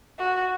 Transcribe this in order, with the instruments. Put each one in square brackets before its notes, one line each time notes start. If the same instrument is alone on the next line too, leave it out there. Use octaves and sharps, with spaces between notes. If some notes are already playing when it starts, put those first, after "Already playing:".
[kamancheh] F#4